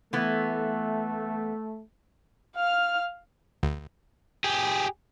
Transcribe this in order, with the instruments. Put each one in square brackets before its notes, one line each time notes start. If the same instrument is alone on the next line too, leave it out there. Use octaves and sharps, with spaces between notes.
[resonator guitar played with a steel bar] E3 B3 [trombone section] A3
[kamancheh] F5 F6
[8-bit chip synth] D2
[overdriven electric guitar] G4 G#4